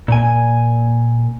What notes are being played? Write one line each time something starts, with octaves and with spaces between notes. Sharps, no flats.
A#2 G#5